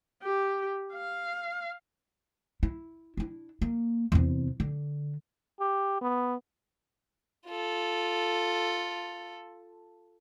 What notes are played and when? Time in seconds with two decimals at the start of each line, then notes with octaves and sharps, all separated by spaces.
0.23 G4
0.94 F5
2.63 E4
3.17 D4 E4
3.62 A#3
4.12 E2 C3
4.60 D3
5.60 G4
6.01 B3
7.47 F4 A4